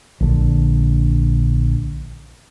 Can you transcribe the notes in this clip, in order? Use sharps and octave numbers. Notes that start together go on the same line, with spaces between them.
A#1 D3